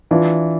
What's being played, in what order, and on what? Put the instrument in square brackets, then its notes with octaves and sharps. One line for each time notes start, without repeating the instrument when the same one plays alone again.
[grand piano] E3 [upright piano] D4 F4